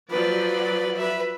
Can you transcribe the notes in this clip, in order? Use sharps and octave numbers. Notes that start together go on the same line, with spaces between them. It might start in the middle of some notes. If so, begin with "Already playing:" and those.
F3 F#3 B4 D5
B4 E5